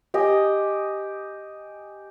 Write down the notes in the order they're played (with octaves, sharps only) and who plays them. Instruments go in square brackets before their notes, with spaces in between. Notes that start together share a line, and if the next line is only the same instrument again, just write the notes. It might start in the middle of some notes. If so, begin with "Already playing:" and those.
[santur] G4 D#5 G#5